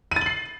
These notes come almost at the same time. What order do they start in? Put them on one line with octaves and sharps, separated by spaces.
D#7 A6 F#7 C7